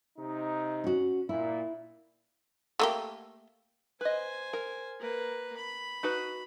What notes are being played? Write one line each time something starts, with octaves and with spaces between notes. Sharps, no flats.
C3 D#4
C#4 F#4
A#2 E4
A3 A#3 G4
B4 C5 D#5 G#5
A#4
A#3 B4
B5
D#4 F#4 B4